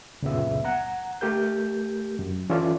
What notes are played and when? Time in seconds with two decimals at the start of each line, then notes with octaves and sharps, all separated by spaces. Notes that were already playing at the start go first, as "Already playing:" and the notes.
0.22 C#2 F#2 A#2 C#3 B3 E5
0.65 F#5 A#5
1.21 A3 G4 A#4 G6
2.19 F#2
2.50 E3 C#4 F4 A4 D5